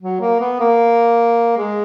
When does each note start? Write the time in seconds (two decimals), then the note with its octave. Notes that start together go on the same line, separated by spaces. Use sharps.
0.01 F#3
0.21 A#3
0.40 B3
0.60 A#3
1.57 G#3